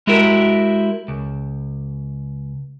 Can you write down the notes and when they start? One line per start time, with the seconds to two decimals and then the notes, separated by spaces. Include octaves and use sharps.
0.07 G#3 E4 F#4 G4 A#4
1.08 C#2